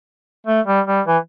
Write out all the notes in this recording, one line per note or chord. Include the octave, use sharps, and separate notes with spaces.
A3
G3
G3
E3